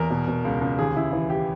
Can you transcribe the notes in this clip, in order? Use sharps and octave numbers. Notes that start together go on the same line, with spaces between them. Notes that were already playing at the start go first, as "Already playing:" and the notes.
Already playing: E2 A#4
B2
B2
C#2
C#2
D#2 G#4
C#3 E4
E3 E4
G4